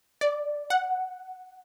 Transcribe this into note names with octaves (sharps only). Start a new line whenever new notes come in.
D5
F#5